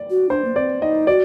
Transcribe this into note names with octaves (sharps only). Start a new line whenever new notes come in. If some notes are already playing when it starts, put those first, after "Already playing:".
Already playing: D5
F#4
D4 C5
A#3
C4 D5
D#4 D#5
F#4 D5